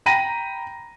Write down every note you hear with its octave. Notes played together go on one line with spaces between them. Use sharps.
G5 A#5 B5 A#6 D#7